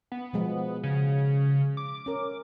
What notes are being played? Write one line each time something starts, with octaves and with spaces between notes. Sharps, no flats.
B3
B2 F3 G#3
C#3
D6
C#4 A#4